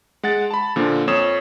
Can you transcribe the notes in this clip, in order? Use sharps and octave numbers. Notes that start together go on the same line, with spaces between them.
G#3 F#5 A6
A5 B5
A#2 D3 F3 A#3
F2 C#5 D#6 E7